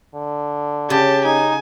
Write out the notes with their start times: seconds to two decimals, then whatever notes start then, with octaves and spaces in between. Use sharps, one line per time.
0.15 D3
0.90 C#3 G4 A5
1.25 D#4 G#5